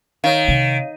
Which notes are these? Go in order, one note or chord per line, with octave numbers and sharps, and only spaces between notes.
D#3 C#5 F5
C3